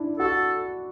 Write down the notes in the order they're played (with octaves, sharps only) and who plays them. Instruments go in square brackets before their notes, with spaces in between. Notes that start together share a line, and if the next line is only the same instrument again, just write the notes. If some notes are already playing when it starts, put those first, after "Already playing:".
Already playing: [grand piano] D4 E4
[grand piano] F#4 [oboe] A4